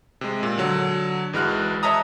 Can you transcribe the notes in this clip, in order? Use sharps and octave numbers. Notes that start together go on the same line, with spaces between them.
C3 G#3
A#2
D3 F#3
G#1 E3 G#3 F#4 F6 F#6
C#5 D#5 E5 A5 A#5 D#6